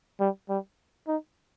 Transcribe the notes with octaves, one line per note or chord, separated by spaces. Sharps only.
G3
G3
D#4